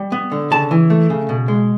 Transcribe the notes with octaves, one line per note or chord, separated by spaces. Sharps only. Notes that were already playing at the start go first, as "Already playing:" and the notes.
Already playing: G3
B3
D3
C#3 A5
E3
A3
C#3
B2
G#3